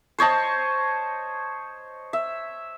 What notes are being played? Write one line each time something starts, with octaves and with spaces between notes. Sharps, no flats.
C5 C#5 D#5 A5
E5